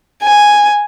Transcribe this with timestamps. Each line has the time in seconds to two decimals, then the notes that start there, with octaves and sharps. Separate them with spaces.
0.23 G#5